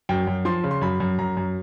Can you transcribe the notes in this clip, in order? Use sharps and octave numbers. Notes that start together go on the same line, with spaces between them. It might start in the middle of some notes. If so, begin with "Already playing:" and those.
F#2 G5
F#2
F3 C6
C#3
C6
F#2 B5
F#2
F#2 A#5
F#2